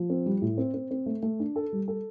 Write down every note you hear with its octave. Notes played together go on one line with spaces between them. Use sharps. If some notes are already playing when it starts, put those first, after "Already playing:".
Already playing: F3
C4
G3
A2
C4
C4
C4
A3
A3
D4
A4
G3
A4